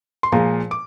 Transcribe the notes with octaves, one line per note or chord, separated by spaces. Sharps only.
C6
A#2 F3 G#3 A#5
D6